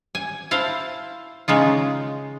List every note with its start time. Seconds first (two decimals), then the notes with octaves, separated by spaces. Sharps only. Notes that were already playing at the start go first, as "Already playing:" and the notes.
0.15 G#5
0.51 E4 C5 F5 A5
1.48 C#3 G#3 D#4 F4